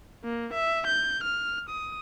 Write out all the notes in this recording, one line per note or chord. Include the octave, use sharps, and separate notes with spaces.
A#3
E5
G6
F6
D#6